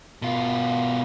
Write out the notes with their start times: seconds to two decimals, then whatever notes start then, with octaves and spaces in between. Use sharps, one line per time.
0.22 B2 F4